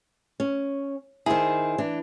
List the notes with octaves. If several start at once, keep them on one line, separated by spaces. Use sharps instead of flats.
C#4
D#3 E4 G#4 C5
E3 D4